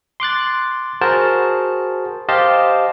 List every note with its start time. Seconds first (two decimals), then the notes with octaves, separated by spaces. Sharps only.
0.20 C6 D6 F#6 A6
1.01 F#4 G#4 A#4 C5 A5
2.29 G4 C5 D#5 F5 A5